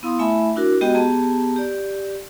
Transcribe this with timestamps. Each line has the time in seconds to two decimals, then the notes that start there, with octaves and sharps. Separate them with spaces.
0.03 B3 E4 F5 C6 D#6
0.19 A3 E4 E5 G#5 B5
0.56 D4 E4 F#4 A#4
0.81 G#3 B3 F#4 G4 D#5 G5
0.94 B3 G4 G#4 A5 A#5
1.56 G4 D5